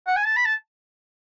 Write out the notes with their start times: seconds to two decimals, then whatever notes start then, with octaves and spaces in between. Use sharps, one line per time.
0.07 F#5
0.16 G#5
0.25 A5
0.36 B5
0.45 A5